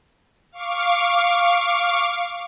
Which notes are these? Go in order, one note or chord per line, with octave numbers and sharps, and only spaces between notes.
F5 C#6 D6